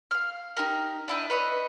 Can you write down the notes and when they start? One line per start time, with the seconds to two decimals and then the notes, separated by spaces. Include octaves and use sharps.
0.11 F5 F6
0.57 D#4 G4 A#4
1.08 D4 E4 D#5 G5
1.30 B4 C#5 D#5